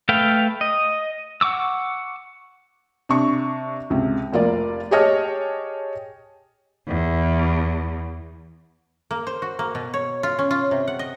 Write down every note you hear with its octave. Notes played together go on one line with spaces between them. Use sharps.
A3 A4 B4 F5 G5
D#5
F#5 C#6 D6 E6
C3 D4 C#6
C#2 C3
F1 A#3 F4 D5
G4 G#4 C#5 D#5 A5 F6
E2
A#3
C5
F#4
A#3
B2
C#5
F4
C#4
F4
C3
F#5
D#5